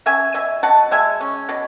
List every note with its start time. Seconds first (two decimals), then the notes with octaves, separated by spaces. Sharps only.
0.06 C#4 E5 G#5
0.34 B2 E5 G#5
0.63 B2 F#5 A5
0.91 G#3 E5 G#5
1.21 C#4
1.49 B2